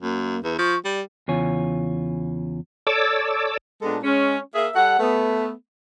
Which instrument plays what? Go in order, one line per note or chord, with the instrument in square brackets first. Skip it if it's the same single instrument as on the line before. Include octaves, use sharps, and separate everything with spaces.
[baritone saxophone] F#2 [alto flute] A#3
[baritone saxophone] E2 [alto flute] B4
[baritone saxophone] F3 [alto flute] C#6
[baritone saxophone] G3 [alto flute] D5
[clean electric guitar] E2 C#3 F4 C#5 G#5
[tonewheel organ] A4 C#5 D5 D6 E6
[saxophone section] A#2 G#3 B3 D4 A4
G#3 C#4
A#3 G#4 E5
G3 A4 F#5
A3 B3